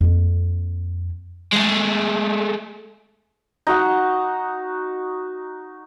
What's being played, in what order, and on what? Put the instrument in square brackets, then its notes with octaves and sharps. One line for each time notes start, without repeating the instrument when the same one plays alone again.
[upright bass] F2 A#3
[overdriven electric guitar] G#3 A3
[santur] D#4 F#4 F#5 A#5